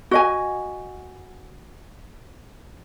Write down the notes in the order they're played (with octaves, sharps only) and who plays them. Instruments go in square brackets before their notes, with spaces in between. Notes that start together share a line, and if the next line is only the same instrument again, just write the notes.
[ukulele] F#4 D#5 G#5